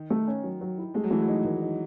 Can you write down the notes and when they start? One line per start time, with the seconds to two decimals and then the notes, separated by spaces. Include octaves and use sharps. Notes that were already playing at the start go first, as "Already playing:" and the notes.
Already playing: D#3
0.10 A3
0.28 C#4
0.43 F#3
0.61 F#3
0.78 E4
0.94 G#3 A3
1.04 F#3
1.11 E3 A3
1.22 F#3
1.28 D#4
1.45 D#3
1.62 D#4